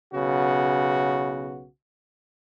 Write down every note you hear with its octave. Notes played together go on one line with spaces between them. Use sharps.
B1 C#3 B3 F#4